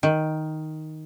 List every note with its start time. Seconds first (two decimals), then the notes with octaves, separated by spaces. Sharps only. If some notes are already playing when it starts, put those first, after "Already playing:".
0.03 D#3